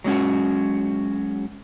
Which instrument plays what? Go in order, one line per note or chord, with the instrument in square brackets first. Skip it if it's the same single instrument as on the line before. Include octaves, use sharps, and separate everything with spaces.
[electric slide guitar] F#3 G#3 C#4 F#4